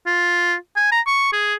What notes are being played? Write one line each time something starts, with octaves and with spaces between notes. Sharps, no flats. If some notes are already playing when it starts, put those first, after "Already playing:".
F4
G#5
A#5
C#6
G#4